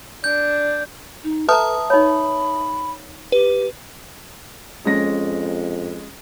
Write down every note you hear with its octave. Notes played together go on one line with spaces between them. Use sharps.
D4 G6
D#4
A4 B4 E5 A5 A#5 D#6
D#4 C#5 B5
G4 B4
F2 G#3 C#4 A#6